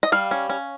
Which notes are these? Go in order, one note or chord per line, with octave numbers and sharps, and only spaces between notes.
D#5
G3 F5
C#4
C#4